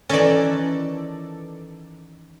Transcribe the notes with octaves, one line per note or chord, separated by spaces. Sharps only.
D#3 E3 C#4 A4 D5 A6 A#6